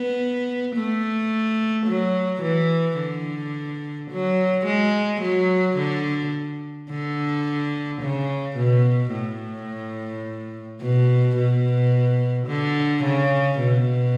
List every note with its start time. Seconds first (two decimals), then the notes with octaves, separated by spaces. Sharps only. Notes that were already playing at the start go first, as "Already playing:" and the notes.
Already playing: B3
0.76 A3
1.86 F#3
2.42 E3
2.98 D3
4.11 F#3
4.66 G#3
5.21 F#3
5.78 D3
6.90 D3
8.01 C#3
8.57 B2
9.12 A2
10.81 B2
11.36 B2
12.47 D3
13.04 C#3
13.60 B2